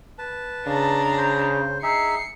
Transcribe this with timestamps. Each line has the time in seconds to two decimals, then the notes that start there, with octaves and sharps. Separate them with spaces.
0.18 B4 A5
0.67 C#3 D4 A#5
1.17 C5
1.83 D#4 G#4 E5 C7 C#7